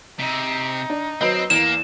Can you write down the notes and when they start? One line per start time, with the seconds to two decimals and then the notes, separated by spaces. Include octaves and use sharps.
0.19 C3 D#4
0.90 D4
1.21 F#3 C4 B4 D#5
1.50 E2 A#3 E7